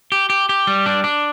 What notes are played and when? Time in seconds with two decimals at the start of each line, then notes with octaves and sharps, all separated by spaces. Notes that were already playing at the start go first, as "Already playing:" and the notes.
0.12 G4
0.30 G4
0.49 G4
0.67 G3
0.86 D4
1.04 D4